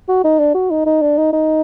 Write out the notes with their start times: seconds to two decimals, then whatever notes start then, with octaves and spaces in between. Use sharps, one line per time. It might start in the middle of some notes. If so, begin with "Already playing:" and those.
0.08 F#4
0.24 D#4
0.39 D4
0.54 F#4
0.71 D#4
0.86 D#4
1.02 D4
1.18 D#4
1.33 D#4